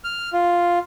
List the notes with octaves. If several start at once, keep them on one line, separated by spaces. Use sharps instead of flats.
F6
F4